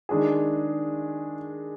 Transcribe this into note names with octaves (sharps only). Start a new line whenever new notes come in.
D#3 G#3 D4 G#4